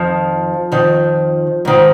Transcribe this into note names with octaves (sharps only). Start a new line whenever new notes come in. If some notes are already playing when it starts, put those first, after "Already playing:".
Already playing: F2 D#3 F3
F2 D#3
G#2 D#3